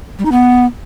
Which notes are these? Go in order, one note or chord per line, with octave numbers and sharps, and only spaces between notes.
G3
D#4
B3